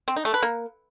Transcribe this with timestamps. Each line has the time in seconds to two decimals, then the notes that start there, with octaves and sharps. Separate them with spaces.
0.08 C4
0.16 D#4
0.25 A3
0.34 B4
0.43 A#3